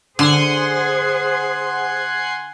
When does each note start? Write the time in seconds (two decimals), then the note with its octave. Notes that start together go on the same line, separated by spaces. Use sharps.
0.19 D3 G#4 C5 F#5 G#5 C6